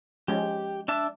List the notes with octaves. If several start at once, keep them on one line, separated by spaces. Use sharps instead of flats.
F3 G#3 C#4 G4
D4 E5 A5